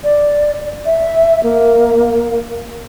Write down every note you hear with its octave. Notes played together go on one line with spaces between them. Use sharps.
D5
E5
A#3